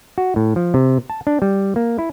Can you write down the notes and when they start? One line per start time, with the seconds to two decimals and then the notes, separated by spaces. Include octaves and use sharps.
0.18 F#4
0.36 A2
0.56 F3
0.74 C3
1.10 A5
1.27 D4
1.42 G3
1.76 A#3
1.98 E4